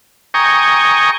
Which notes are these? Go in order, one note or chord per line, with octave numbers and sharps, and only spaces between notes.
G5 G#5 A#5 C#6 D#6